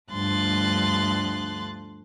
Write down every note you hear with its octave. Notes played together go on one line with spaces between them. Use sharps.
D2 G2 F3 C6 F#6 A6